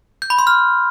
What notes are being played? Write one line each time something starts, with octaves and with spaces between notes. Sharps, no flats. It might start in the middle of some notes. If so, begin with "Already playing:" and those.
G6
B5
C6
F6